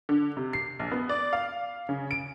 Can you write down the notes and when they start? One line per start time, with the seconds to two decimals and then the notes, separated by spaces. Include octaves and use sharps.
0.09 D3
0.37 C3
0.53 C7
0.79 A#1
0.92 B3
1.09 D5
1.33 F5
1.89 C#3
2.11 D7